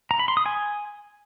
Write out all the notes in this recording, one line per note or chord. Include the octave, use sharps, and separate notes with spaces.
A#5
B5
C6
D#6
G#5